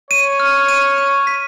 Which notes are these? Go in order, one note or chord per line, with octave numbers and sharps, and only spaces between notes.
C#5 D#7
F6
D#7
D#7
B6